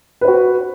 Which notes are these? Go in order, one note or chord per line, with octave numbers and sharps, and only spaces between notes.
F#4 B4 C5